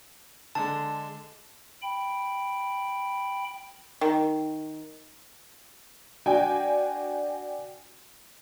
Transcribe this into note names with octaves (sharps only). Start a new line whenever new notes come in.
D3 G#3 A5
G5 B5
D#3
D4 F#4 G5 G#5